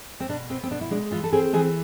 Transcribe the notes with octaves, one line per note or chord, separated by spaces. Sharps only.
C4
B2 D4
B3 C4
C4
B2 D4
E4
G#3 D4
E3 F4
A4
C4 G#4
E3 G#4